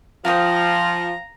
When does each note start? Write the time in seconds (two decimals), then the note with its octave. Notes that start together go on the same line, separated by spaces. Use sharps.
0.25 F3 F5 G5 A#5 D#6